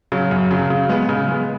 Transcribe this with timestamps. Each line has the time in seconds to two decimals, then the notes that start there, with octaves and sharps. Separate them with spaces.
0.12 C#3 F#3
0.31 F#2
0.51 C#3 F#3
0.70 C#3
0.89 G#3 B3
1.09 C#3
1.28 G#3 B3